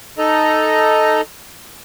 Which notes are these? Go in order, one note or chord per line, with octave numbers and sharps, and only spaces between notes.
D#4 A4 D#5 A#5